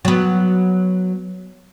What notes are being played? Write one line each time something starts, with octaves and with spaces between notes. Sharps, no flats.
F#3 B3